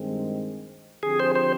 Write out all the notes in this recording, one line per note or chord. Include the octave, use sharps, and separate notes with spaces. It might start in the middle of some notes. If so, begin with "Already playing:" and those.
Already playing: G2 D#3 G#3 C4
D3 F3 C4 G4 G#4
C5
C5